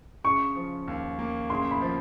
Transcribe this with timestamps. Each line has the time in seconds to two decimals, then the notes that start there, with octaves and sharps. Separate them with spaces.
0.24 C#3 C#6
0.56 F3
0.88 D#2
1.19 A#3
1.50 C#3 C6
1.71 B5
1.81 F3